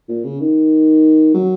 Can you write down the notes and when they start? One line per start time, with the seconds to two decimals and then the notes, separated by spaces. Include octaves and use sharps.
0.08 A#2
0.24 C#3
0.40 D#3
1.34 F#3